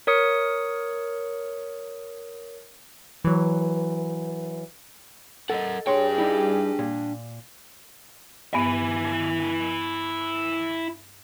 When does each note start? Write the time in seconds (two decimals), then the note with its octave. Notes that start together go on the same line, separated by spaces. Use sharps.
0.07 A#4 C#5 D#6 C#7
3.24 E3 F#3
5.50 A4 A#4 D#5 F#5
5.87 G2 D4 G4 G#4 C#5 G5 C6
6.18 G3 D#4 E4
6.79 A#2
8.54 G2 B3 E4 G#5